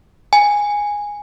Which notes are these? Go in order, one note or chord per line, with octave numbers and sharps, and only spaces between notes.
G#5